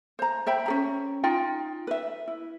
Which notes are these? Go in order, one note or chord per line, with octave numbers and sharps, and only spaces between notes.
C5 A#5
C5 E5 G5 B5
C#4 G#4 A#5
D#4 F4 G5
B4 E5
E4